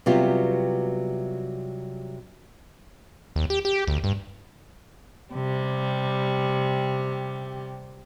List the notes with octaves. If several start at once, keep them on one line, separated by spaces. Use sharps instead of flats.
C3 F#3 G3 B3 F4 G4
D#2
G4
G4
D2
G2
C3 G3